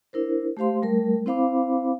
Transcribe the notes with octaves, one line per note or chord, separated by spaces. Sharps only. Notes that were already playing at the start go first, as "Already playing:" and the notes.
D4 E4 A#4 C5
A3 G4 C5 F5 C6
G3 A3 A#4
C4 E4 C5 F5 B5 D6